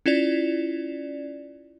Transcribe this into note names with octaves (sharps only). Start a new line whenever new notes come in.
C#4 E4 F4 D5